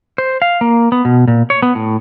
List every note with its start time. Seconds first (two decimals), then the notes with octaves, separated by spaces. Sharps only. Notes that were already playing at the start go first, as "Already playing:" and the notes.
0.18 C5
0.42 F5
0.61 A#3
0.92 B3
1.05 B2
1.28 A#2
1.50 C#5
1.62 B3
1.75 A2